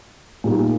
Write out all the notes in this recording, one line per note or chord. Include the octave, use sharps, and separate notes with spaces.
A#2 G3 A#3 D#4